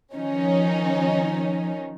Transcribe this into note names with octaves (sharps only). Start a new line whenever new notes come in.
D#3 F3 C#4 D#4